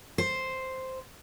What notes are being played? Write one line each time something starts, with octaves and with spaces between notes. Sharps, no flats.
C5